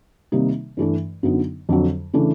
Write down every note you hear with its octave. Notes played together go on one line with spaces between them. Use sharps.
C3 D#3 G3 A#3 D#4
G2 E3 A3 D4
F#2 D3 F#3 B3 D#4
F2 D3 F#3
C#3 E3 A3 D4